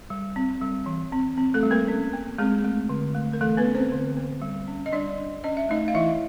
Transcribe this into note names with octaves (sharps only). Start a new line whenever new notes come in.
G3
C4
G3
E3
C4
C4
A3 A4
G3
A#3 A#4
C#4
A#3
G#3 C4 G#4
A3
D3
A3
A#4
E3 A3 A4
B3 B4
C#4
C4 C5
D3
A#3
G3
C#4
D#5
G3 D4 D5
D4
C#4 D#5
E5
A3 D#4 D#5
F5
E3 E4 E5